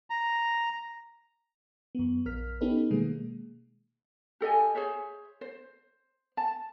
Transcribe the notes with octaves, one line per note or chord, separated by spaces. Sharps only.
A#5
F#2 B3
A#1 A#4 F6 B6
B3 C#4 D#4 G4 A4 B4
B2 D#3 G#3 A#3 G#4
G4 A4 D#5 G#5
G#4 C5 C#5 E5
C5
A5